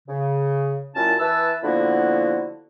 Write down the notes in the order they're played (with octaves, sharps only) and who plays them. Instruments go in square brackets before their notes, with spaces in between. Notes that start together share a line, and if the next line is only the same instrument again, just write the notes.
[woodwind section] C#3
F#2 A#2 C#4 E4 A5
E3 E4 B4 A5 E6
D3 F3 A#3 B3 E4 F#4